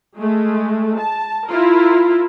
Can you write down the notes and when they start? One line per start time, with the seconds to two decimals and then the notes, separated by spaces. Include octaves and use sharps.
0.17 G#3 A3
0.99 A5
1.48 E4 F4 A#4